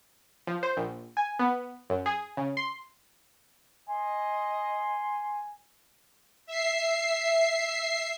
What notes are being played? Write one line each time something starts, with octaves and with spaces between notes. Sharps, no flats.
F3
C5
A#1
G#5
B3
F#2
G#4
C#3
C6
D#5 G#5 C6
E5 C7